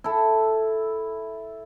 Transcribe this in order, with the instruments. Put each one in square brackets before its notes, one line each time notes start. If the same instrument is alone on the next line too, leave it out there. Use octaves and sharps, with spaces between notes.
[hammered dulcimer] E4 A4